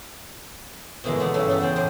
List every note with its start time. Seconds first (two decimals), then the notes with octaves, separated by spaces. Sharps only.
1.04 B2 D3 E3 G#3 A#3
1.19 A3 B3 D4 E4 G#4
1.34 G2 E3 A3 C#4 A4
1.48 C#3 B3 A4
1.60 E2 G#4 C5 G5
1.76 A2 C#3 D4 C5 G#5